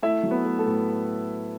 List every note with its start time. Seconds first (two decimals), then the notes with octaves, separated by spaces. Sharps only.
0.02 A3 E4 E5
0.23 F#3
0.31 B3 B4
0.45 A3
0.59 A3 A4
0.66 A2